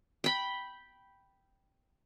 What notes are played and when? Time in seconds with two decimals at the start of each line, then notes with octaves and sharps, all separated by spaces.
0.24 G5 B5